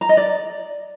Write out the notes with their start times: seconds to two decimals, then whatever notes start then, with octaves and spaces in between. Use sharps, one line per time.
0.01 A#5
0.09 D#5
0.17 D5